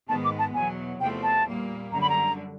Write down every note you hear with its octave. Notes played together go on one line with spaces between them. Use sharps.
G#2 D#3 G#3 B3 A5
D6
A5
E2 B2 F#3 G#5
E2 C3 F3 A3 C4 G5
A5
A#2 G3 A#3
F#2 D3 G3 A#5
B5
A#5